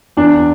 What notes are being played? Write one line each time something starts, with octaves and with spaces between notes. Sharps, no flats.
E2 D4